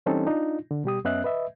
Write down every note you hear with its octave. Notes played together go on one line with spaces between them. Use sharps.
E3 G3 C4 C#4 D#4 A4
D4 D#4 F4
D3
B2 G3 G4 D#6
F#2 B3 C#4 D#5 E5 F#6
B4 D#5 E5